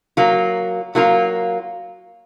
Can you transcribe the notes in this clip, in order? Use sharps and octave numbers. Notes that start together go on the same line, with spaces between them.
F#3 A#3 F4
F#3 A#3 F4